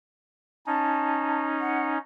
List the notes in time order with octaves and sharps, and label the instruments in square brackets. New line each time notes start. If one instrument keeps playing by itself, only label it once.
[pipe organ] C#4 D#4 [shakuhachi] A5
[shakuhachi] F#5